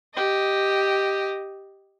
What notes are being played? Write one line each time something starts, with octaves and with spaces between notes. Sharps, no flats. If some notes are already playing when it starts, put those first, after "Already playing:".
G4 D#5